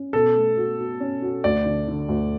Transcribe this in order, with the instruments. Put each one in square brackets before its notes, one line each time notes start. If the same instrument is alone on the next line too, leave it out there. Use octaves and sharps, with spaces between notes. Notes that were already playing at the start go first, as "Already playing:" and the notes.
Already playing: [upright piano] C#4
[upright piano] B2 [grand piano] A4
[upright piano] A3
F#4
F#4
C#4
F#4
[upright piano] D2 [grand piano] D5
[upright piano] D3
D3
D2